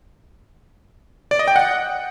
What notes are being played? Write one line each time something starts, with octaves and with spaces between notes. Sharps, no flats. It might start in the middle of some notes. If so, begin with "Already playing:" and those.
D5
D#5
G5
F#5